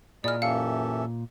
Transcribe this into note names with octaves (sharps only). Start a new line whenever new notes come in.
A#2 E4 G#4 D5 D#5 F6
F#2 E3 C#4 G4 A4 E5 F5 C#7